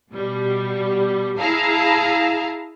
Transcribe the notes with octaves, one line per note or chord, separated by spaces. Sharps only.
B2 G3
E4 G#4 F5 A5 A#5